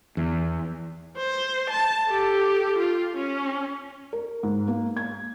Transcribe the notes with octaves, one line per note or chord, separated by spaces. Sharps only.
E2
C5
A5
G4 A4
F4
C#4
A#4
G#2
A#3
G#6